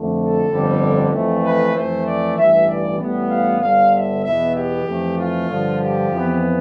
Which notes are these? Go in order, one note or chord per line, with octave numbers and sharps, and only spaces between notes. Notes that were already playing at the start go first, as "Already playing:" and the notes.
Already playing: F2 D3 A3
A4
G1 F2 D3 G3
F2 E3 A3
B4
F2 E3 A3 C5
D5
A1 G2 E3 E5
D5
A1 A2 G3 B3
F5
G1 G2 D3 F5
E5
E2 B2 B3 E5
G4
F2 E3 A3
F4
G2 D3 F3
G4
F2 E3 B3